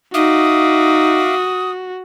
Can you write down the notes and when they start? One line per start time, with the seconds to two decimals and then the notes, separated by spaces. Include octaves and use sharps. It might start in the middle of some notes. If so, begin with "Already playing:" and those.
0.14 D#4 F#4 E5 F5 D6 D#6